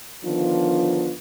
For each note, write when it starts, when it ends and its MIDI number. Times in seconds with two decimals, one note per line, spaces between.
0.24 1.12 50
0.24 1.12 51
0.24 1.12 53
0.24 1.12 59
0.24 1.12 62
0.24 1.12 65